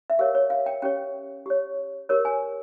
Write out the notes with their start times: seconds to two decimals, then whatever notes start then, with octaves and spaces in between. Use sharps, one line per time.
0.10 E5
0.19 G4 A#4 C#5 F5
0.35 C#5
0.50 F5
0.66 G5
0.82 C#4 G4 C#5 G5
1.46 G4 C#5
2.09 G4 A#4 C#5
2.25 G#5